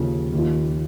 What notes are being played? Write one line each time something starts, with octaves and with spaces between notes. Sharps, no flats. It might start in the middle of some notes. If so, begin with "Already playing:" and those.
Already playing: D#2 C#3 F3
D#2 D#3 A#3 F4